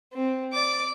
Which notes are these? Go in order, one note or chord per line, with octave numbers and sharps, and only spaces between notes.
C4
D5 D6